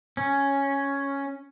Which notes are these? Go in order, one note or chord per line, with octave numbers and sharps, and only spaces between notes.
C#4